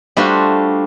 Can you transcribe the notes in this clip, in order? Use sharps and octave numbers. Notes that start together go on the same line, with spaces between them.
G3 A3 D4 F4 F#4 C5